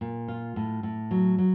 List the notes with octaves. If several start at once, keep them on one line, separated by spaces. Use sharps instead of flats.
A#2
F4
A2
A2
F#3
F#3